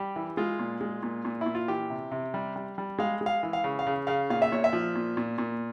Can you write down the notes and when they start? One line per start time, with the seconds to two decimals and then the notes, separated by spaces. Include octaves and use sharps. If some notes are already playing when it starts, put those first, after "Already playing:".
Already playing: G3 G4
0.16 E3
0.37 G#3 F4
0.59 A#2
0.81 G#3
1.03 A#2
1.25 A#2
1.41 A#2 E4
1.55 F4
1.68 E3 G4
1.90 C3
2.11 C3
2.34 G3
2.56 G3
2.78 G3
2.98 G#3 F5
3.21 G#3
3.26 F5
3.43 E3
3.53 F5
3.64 C#3
3.79 F5
3.87 C#3
4.07 C#3 F5
4.30 A#2 F5
4.42 E5
4.52 A#2 C#5
4.64 E5
4.73 F3
4.95 A#2
5.17 A#2
5.38 A#2